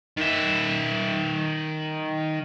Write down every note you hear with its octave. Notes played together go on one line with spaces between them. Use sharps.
D#3 E5